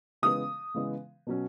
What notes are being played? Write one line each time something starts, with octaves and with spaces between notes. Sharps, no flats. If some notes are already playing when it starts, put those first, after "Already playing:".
C#3 E3 G#3 B3 D#6
C#3 E3 G#3 B3
B2 F#3 C#4